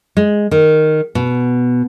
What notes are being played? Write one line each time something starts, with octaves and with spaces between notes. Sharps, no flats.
G#3
D#3
B2